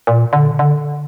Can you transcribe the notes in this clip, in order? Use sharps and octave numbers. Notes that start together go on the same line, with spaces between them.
A#2
D3
D3